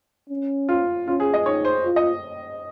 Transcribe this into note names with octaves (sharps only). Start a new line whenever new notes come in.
C#4
F4
C#4 F4
G#4
D#5
D#4 C#5
C5
F4
D#5